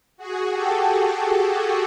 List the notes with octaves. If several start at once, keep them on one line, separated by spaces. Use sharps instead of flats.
F#4 G#4
G4 A4
G4 A4
F#4 G#4